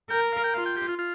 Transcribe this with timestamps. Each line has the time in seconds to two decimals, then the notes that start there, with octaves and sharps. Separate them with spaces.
0.10 A#4 G5
0.32 F5
0.44 G5
0.54 F4 F5
0.66 G5
0.77 G4
0.88 F4
0.99 F4